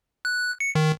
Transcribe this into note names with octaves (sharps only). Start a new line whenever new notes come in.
F#6
C#7
D#3